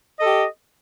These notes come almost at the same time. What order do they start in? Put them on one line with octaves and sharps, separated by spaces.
D#5 A4 G4